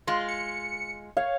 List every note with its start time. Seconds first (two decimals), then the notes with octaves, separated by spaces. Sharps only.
0.07 G#3 F4 C6
0.28 C#7
1.17 C#5 F5